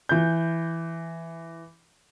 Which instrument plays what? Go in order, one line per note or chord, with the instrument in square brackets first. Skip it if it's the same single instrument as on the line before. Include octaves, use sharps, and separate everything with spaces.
[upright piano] E3 G6